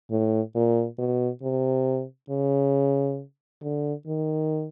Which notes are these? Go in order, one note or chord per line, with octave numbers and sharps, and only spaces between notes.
A2
A#2
B2
C3
C#3
D3
D#3